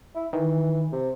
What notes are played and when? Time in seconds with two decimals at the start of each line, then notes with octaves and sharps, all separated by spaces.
0.15 E4
0.33 D#3 E3
0.92 C3